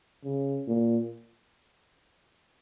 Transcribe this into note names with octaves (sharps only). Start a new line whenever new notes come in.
C#3
A#2